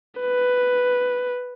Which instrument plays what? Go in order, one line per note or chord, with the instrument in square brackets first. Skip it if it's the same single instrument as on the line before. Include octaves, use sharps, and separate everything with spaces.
[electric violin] B4